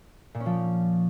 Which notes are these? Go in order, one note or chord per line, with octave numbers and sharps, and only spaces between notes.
A#2
C#4
F3